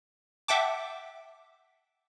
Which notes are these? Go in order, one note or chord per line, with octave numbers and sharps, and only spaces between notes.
E5 F#5 G5 A5 D6